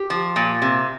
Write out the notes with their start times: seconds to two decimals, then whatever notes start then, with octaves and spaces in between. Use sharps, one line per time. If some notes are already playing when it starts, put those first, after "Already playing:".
Already playing: G4
0.10 F3
0.36 A#2
0.62 C3